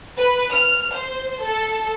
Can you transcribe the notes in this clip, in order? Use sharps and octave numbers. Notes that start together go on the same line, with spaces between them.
B4
F6
C5
A4